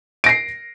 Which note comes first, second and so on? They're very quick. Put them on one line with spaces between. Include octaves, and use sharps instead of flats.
D7 A#6 C7